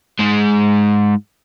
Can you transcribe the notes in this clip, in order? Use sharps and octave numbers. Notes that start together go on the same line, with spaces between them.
G#2 G#3